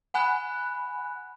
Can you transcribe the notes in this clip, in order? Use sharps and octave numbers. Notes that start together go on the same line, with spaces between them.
F#5 G#5 B5 F#6